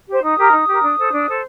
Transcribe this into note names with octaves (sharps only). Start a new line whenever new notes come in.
G4 C5
D#4 D#6
G4 A#4
D#4
G4 A#4
D4
A4 C5
D4
A4 C5